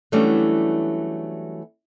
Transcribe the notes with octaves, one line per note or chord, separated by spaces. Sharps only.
E3 F#3 G3 A3 C#4 D4